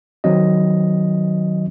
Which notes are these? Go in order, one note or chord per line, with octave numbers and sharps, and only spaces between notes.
D#3 F#3 C4 D#5